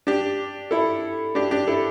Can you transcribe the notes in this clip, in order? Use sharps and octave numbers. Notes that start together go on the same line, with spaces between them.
D4 G4
E4 A4
D4 G4
D4 G4
E4 A4